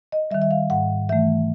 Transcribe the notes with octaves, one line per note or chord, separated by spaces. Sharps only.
D#5
D#3 G3 E5
E5
F5
G#2 F#5
E3 A3 E5